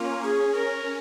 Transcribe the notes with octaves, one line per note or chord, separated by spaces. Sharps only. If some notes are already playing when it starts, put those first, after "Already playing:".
Already playing: A#3 C#4 F4
C#4 G#4
C#4 A#4